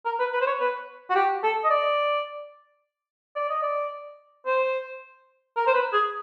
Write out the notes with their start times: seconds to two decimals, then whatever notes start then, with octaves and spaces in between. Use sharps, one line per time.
0.05 A#4
0.19 B4
0.33 B4
0.41 C5
0.46 C#5
0.60 B4
1.10 F#4
1.15 G4
1.43 A4
1.64 D#5
1.70 D5
3.36 D5
3.49 D#5
3.62 D5
4.46 C5
5.56 A#4
5.67 C5
5.74 B4
5.93 G#4